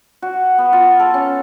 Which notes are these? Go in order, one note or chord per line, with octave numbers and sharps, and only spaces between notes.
F#4
B3
F4
A4
C#4